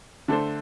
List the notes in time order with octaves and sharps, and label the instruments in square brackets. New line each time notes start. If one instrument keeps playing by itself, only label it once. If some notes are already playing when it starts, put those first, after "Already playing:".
[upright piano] D3 A3 D4 A4 C5